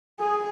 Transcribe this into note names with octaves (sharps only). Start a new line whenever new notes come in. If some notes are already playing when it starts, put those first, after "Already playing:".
G#4